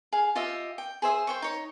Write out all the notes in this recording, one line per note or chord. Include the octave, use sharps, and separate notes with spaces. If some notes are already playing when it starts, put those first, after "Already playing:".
G#4 F5
F4 G4 D#5 E5
G5
G#4 C5 E5 D#6
C5 G5 C#6
D#4 C#5